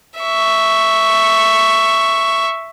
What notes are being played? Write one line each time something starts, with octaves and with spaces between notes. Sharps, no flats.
E5 C#6